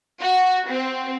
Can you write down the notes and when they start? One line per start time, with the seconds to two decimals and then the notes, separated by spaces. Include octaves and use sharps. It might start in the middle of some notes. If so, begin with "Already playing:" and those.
0.20 F#4
0.68 C4